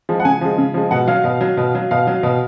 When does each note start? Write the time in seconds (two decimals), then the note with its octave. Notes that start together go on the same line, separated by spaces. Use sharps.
0.09 F3 G#3
0.20 F#5
0.25 C#3 G#5
0.41 F3 G#3
0.58 C#3
0.74 F3 G#3
0.91 B2 F#5
1.08 F#3 F5
1.24 B2
1.41 F#3
1.57 B2
1.75 F#3
1.91 B2 F5
2.07 F#3
2.23 B2